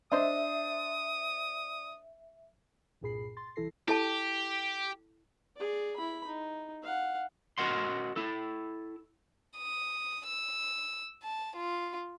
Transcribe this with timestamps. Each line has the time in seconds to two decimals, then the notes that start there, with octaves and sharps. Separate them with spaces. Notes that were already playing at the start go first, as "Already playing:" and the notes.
0.12 D4 C5 D#5 E5 D#6
3.01 C2 G2 A#2 G#4 B5 C7
3.37 C6 A6
3.56 C2 E3 E4 A4 A#6 C7
3.88 E4 G4 A4 A5
5.56 G#4 D5
5.96 E4 B5
6.27 D#4
6.83 F5 F#5
7.58 F#4 A#4 D#5 F#5 C6
8.16 E4 A4
9.57 D#6
10.26 E6
11.23 A5
11.56 F4